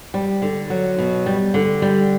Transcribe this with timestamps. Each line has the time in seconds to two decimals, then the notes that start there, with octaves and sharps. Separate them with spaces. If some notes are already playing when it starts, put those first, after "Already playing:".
0.14 G3
0.42 D3
0.70 F#3
0.98 B2
1.26 G3
1.54 D3
1.82 G3